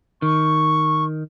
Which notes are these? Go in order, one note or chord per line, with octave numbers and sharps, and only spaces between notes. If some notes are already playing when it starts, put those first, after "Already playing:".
D#3 C#6